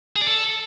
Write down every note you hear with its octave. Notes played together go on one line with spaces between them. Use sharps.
G#4
D5
A4